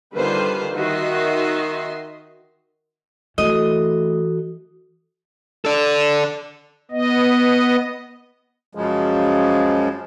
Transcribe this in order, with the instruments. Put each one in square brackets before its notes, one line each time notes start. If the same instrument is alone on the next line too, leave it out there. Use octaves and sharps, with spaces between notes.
[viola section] D3 D#3 G3 F4 B4 C5
D#3 F#4 D#5 E5 C6
[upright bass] E3 [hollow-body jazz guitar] A3 [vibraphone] F#4 A4 [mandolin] D#5
[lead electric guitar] A4 D5
[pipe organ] B3 D#5
[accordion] F#2 C#3 F3 G#3